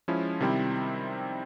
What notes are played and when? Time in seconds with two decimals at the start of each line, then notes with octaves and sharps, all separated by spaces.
0.08 F3 G#3 C#4 E4
0.40 C3 D#3 G3 C4 E4